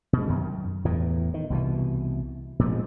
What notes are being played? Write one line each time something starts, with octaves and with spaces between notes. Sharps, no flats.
B2 G#3
F#2 D#3
E2 A2 E3
D#3
C2 B2 E3
A#2 F3 G#3